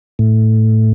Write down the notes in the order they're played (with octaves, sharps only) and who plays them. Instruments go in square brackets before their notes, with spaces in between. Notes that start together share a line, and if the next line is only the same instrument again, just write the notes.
[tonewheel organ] A2